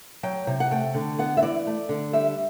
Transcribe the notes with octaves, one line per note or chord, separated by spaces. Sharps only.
F#3 G5
C3
F#5
A3 G5
D3
B3 F#5
E5
E3 D5
A3
D3
G3 E5